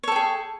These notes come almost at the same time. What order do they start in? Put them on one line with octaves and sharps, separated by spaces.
C#5 A4 G5 G#4